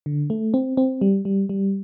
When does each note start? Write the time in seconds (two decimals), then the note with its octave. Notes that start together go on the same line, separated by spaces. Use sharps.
0.06 D3
0.30 A3
0.54 C4
0.77 C4
1.01 G3
1.25 G3
1.49 G3